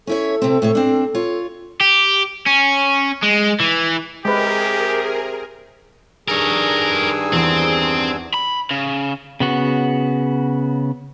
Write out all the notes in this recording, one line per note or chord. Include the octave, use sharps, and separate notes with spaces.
C#4 E4 A4 C#5
C3 C4
A2 C3 C#5
C4 D4
F4 C#5
G4
C#4
G#3
E3
C3 G#3 G4 G#4 A#4 B4
G2 D#3 D4 G#4 A#4 C#5 G#5 E6
E2 C4
B5
C#3
C#3 B3 F#4